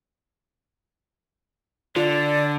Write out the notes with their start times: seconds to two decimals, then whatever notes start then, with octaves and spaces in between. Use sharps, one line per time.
1.96 D3 F4 D5